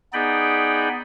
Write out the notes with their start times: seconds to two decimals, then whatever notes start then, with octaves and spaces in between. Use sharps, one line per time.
0.13 B3 D#4 G#4 D5 G5 B5